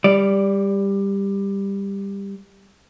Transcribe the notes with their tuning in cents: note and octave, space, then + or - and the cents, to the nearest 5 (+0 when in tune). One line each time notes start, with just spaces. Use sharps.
G3 +15 D5 -5